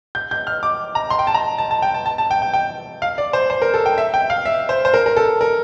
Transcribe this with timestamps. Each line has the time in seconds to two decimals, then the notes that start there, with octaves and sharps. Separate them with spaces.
0.15 G6
0.31 G6
0.47 F6
0.63 D6
0.95 A#5
1.10 C6
1.19 G5
1.27 A5
1.34 A#5
1.58 A5
1.71 A5
1.82 G5
1.94 A5
2.06 A5
2.18 A5
2.31 G5
2.42 G5
2.54 G5
3.02 F5
3.18 D5
3.33 C5
3.50 C5
3.62 A#4
3.74 A4
3.86 G5
3.98 E5
4.14 G5
4.30 F5
4.46 E5
4.69 C5
4.85 C5
4.94 A#4
5.06 A#4
5.17 A4
5.41 A#4